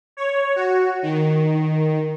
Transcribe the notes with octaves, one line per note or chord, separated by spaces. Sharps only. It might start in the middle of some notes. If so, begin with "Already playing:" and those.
C#5
F#4
D#3